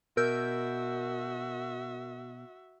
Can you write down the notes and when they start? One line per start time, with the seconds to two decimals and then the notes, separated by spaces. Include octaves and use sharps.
0.17 B2 F#4 A#4 E5 E6 G6